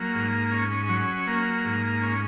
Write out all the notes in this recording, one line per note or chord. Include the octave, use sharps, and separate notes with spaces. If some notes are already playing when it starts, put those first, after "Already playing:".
Already playing: F#3 A#3
G#2
C#4
F#3
A#3
G#2
C#4